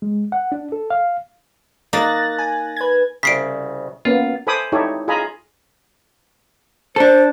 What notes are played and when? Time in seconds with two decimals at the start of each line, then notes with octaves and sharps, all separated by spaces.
0.02 G#3
0.32 F#5
0.52 D4
0.72 A4
0.90 F5
1.93 A#3 D#4 F#6 A6 A#6
2.38 G#5
2.76 B4 G#6
3.23 C2 C#3 B6 C7 D7
4.05 A#3 B3 C#4 F4
4.47 A4 C5 G#5 B5 D6 D#6
4.72 D#4 E4 G4 A4 C#5
5.08 F4 G#4 D#5 G#5 A#5 B5
6.96 D4 A4 C5